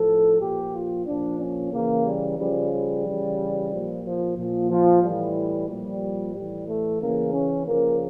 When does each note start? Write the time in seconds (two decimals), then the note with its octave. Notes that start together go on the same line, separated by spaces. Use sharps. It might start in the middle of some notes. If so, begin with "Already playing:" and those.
Already playing: A2 F3 A4
0.40 A#2 F3 G4
0.73 F4
1.07 A#2 F3 D4
1.39 C#4
1.73 C#3 E3 A#3
2.05 G3
2.38 C#3 F3 G3
2.72 G3
3.05 C#3 E3
3.71 A#2 F3
4.04 F3
4.37 A#2 F3
4.70 F3
5.02 A2 E3 G3
5.69 A#2 F3 G3
6.35 A2 E3 G3
6.68 A3
7.01 C#3 E3 A#3
7.34 C#4
7.67 C#3 F3 A#3